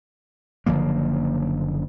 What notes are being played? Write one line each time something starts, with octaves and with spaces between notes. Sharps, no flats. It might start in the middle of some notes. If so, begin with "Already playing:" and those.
F#1 D3 F3 A#3